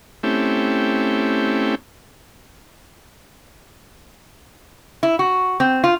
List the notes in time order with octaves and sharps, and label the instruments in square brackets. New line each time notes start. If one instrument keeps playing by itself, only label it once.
[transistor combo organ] A3 C4 C#4 E4 G4
[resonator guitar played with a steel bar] E4
F#4
C4
F4